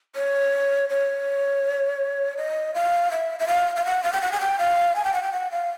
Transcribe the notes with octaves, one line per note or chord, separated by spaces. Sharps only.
C#5
C#5
D#5
F5
E5
E5
F5
F5
F#5
F5
G5
F#5
G#5
G5
F5
G#5
G5
F#5
G5
F#5
F5